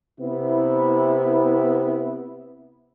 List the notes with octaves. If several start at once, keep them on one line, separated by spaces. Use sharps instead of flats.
C3 B3 E4